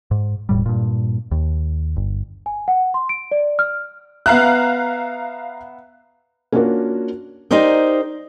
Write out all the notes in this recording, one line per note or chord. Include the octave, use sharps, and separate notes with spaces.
G#2
E1 A2 G3
G2 A#2
D#2
G1
G#5
F#5
C6
D7
D5
F6
B3 E5 F5 A#5 F#6
A#3 C#4 D4 F4 F#4 A#4
D#4 G4 A#4 C5 D5